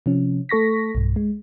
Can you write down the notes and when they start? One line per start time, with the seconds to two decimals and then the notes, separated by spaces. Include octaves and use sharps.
0.06 C3 F3 C#4
0.49 A3 A4 C#6 A#6 B6
0.95 B1 G2
1.16 G#3